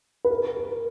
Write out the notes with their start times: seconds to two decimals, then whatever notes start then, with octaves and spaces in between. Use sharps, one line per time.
0.25 B4
0.31 A#4
0.57 A#4